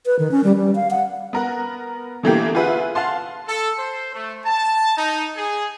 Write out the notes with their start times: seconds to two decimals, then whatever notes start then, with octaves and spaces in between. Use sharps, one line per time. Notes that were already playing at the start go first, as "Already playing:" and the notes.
0.06 B4
0.19 D#3
0.31 C#4
0.44 G3
0.56 G3
0.75 F5
0.90 F#5
1.33 B3 A#4 F#5
2.23 B2 D3 E3 A3 A#3 G4
2.55 F4 G#4 B4 E5 F#5
2.95 F5 F#5 A5 C6
3.48 A4
3.79 C5
4.14 A3
4.46 A5
4.97 D#4
5.37 G#4